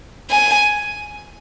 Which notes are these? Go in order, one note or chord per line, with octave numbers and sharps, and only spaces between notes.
G#5